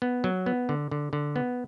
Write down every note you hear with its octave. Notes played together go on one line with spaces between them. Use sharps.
B3
F#3
B3
D3
D3
D3
B3